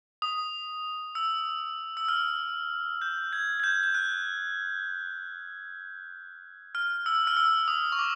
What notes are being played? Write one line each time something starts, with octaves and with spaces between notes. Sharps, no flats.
D#6
E6
E6
F6
G6
G#6
G#6
G6
G6
F#6
F6
E6
F6
E6
D#6
C#6
D6